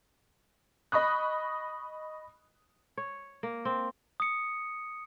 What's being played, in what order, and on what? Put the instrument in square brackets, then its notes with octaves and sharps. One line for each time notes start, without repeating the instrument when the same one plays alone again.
[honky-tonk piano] D#5 B5 C#6 D#6 F#6
[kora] C#5
A#3
C4
[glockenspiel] D#6 C#7